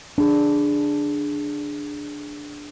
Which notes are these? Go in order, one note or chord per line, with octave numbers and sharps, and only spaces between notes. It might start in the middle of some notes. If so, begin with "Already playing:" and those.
D4 G#4